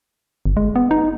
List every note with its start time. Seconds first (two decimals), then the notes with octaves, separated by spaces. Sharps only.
0.46 G1
0.57 G#3
0.76 B3
0.91 D#4